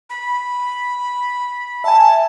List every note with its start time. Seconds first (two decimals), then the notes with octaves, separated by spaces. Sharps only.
0.10 B5
1.84 E5 G#5 A5